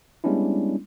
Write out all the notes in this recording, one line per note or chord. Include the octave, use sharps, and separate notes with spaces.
G3 G#3 B3 C#4 D4 E4